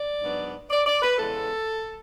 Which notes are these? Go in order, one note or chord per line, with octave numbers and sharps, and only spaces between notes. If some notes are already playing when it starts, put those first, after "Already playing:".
Already playing: D5
G#2 F#3 B3 D4
D5
D5
B4
E2 C#3 G#3 B3 A4